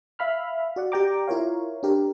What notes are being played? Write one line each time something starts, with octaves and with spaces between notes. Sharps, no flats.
E5 F5 B5 F6
F#4 D5 F#5
G4 D5 G5 A#5 D6
E4 F4 A#4 C#5 F5
D4 G4 A#4